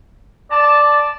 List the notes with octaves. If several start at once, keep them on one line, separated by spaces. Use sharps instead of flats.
D5 A5